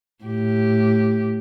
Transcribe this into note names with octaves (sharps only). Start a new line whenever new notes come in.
A2 G4